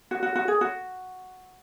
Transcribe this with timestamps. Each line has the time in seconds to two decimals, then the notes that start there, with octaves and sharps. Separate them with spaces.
0.11 F#4
0.23 F#4
0.36 F#4
0.48 G#4
0.61 F#4